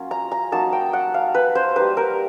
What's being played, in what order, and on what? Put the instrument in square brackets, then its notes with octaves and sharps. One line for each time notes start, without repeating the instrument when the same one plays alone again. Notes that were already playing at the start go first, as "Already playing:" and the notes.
Already playing: [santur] F#3 A#3 C#4 F4
A#5
A#5
F#3 A#3 D#4 A5
G5
F#5
F5
B4
C5
G3 A#3 D#4 B4
A#4